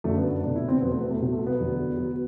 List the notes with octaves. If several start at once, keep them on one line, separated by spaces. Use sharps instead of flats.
F#2 D3 F#3 A3
B3
B3
C2 B2 F#3 D4
E4
C4
E2 B2 F#3 B3
A3
B3
A3
C2 B2 F#3
A3
B3
E2 D3 F#3
F#3